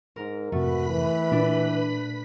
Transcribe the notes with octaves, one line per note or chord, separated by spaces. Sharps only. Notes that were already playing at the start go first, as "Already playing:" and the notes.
G#2 A#4
F2 G#2 C3 A3 F#4 B4 B5 B6
E3
A#2 D4